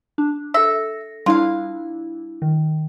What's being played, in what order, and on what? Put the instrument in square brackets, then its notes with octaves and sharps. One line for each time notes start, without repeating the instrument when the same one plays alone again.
[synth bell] D4
[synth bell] A4 A#6 [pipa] E5
[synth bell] G3 D4 E4 [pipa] F4 F5
[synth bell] D#3